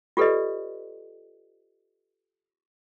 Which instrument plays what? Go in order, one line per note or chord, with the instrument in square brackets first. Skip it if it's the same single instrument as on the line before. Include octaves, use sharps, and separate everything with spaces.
[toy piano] F4 G4 A4 B4 D5 D#5